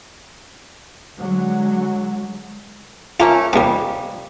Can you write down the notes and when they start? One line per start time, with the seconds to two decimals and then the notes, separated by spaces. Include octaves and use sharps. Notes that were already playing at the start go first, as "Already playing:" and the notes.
1.16 D3 F#3 G#3
3.20 A3 A#3 C#4 F4
3.53 D#2 F3 G3 G#5